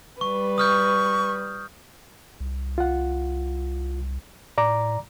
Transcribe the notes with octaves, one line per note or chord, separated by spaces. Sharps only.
G3 B4 C#6
C#6 D#6 F6 G6
C2
F4 F#5
A2 D5 A#5 D6